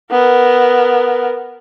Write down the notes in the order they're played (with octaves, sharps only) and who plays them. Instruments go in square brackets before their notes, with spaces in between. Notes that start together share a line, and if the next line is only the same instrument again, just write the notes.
[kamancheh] B3 A#4